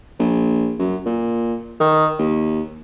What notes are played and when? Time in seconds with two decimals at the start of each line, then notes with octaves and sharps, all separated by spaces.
0.19 A#1
0.79 F#2
1.06 A#2
1.80 D#3
2.19 D#2